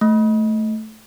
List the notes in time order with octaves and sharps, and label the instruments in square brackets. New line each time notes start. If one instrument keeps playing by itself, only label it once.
[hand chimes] A3